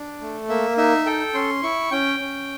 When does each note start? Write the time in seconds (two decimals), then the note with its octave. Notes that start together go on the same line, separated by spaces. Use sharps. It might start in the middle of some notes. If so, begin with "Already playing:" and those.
Already playing: D4
0.21 A3
0.49 A#3 E5
0.77 D#4 E5
1.06 A4 G5
1.34 C#4 C6
1.63 E4 C#6
1.91 C#4 G5
2.20 C#4